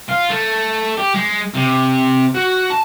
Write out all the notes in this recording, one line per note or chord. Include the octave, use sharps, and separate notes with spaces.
F4
A3
G4
G#3
C3
F#4
A5